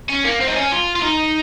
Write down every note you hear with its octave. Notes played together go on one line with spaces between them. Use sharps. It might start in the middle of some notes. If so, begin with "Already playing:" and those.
C#4
A#3
C4
D#4
C#4
F4
F4
D#4